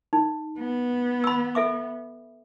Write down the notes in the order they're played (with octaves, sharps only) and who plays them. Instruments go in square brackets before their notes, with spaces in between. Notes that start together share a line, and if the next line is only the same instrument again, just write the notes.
[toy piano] D#4
[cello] B3
[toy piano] B5 E6
A4 E5 D6